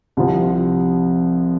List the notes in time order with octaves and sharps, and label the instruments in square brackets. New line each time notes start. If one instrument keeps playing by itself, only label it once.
[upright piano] C2 C3 F3